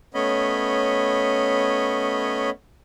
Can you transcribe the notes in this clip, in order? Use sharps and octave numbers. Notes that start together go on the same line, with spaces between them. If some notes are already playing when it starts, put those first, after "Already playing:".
A3 B3 C#4 C#5 D#5 B5